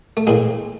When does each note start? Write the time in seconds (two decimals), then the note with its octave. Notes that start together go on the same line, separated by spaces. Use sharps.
0.17 A3
0.27 A2 E3 G#3 A#3